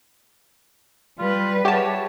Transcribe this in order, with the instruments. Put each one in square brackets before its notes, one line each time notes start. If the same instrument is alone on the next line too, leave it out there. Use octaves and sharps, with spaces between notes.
[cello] G3 B4 [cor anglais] F4
[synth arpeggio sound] G4 A5 [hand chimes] G#4 E5 F#5 [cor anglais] C#5